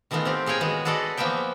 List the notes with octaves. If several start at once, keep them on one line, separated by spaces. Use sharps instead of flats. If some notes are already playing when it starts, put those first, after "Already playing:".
D#3 E3 A3 B3 D#4 F4
C4 F4 G4
A#2 G#4 C#5 G5 G#5 A#5
D#3 E3 G#3 B3 F#4
F#4 G#4 A4 B4 D5 D#5
E3 F3 A#3 B3 E5 G5